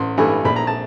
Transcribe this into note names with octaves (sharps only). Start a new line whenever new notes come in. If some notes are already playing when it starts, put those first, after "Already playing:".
Already playing: A1 C6
G2 E3 A3
A#1 B5
A#5
A5